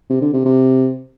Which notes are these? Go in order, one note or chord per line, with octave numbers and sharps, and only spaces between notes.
C3
D3
C3
C3